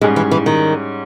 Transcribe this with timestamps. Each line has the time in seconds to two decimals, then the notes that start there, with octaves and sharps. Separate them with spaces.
0.01 G#2 G3 G#3 C#4 G#4
0.16 E3
0.31 E3
0.46 D#3